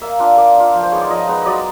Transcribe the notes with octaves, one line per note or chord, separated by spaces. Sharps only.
A#3 E5
D4 F4
A#3 D5
D4 F4
F3
C5
G#3 B3 D#4 C#5
D5
F3 D#5
G#3 B3 D#4
F#3 D5 D#5